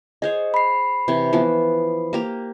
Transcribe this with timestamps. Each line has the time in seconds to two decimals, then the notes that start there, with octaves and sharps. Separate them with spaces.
0.22 G#4 C5 C#5 D#5
0.54 B5 C7
1.08 C3 E3 C#5
1.33 E3 F3 B3
2.13 A#3 G4 A#5